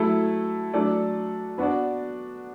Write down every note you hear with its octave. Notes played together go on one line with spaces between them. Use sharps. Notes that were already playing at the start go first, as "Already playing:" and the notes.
Already playing: F#3 A3 E4 A4
F#3 A3 D4 A4 D5
B3 D4 F#4 B4 D5